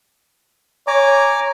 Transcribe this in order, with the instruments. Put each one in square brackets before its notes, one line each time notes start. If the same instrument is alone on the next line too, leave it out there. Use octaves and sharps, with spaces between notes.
[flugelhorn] C#5 [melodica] G#5 A#5 D6